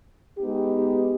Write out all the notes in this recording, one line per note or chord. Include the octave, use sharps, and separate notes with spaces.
G#3 B3 D#4 G4